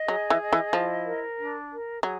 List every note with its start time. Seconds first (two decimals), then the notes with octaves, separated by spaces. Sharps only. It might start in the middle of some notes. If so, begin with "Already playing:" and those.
Already playing: D#5
0.08 F#3 G#4
0.30 E3
0.41 D#5
0.53 E3
0.73 F3 E4
1.05 A#4
1.39 D4
1.70 A#4
2.03 F#3 G#4